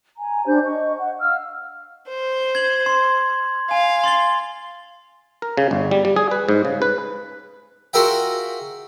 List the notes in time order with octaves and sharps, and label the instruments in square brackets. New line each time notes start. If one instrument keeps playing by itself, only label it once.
[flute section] G#5 A#5
D4 G4 C5 G6
D#5 C#6
F#5
F5 E6 F6
[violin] C5
[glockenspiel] G#6 F#7
C6
[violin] F5 [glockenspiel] G#5
[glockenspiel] C6 A6 G7
[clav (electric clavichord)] A#4
C#3
G1
G3
G3
G#4
B4
G#2
C#3
B4
[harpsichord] F4 F#4 G#4 A#4 E5 G5